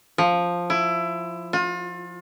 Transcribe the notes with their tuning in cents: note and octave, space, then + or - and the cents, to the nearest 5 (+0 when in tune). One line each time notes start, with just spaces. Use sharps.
F3 +5
E4 +20
F4 +35